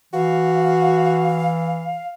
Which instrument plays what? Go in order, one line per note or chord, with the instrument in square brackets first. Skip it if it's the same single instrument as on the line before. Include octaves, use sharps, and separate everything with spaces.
[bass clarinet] E3 [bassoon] F#4 [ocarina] F5